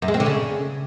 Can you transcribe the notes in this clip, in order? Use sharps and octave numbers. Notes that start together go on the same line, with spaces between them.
F#2
G#3
C4
D3
C#3